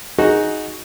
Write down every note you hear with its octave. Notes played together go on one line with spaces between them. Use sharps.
D#4 F#4 G#4